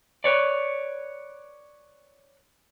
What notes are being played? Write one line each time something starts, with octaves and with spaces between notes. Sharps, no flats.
B4 C#5 D5